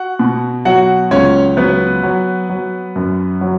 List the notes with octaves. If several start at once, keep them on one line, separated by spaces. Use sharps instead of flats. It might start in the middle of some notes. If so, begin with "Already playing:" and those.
Already playing: F#4 F#5
B2
F#3 F#4 F#5
C#2 C#4 C#5
F#3 B3 B4
F#3
F#3
F#2
F#3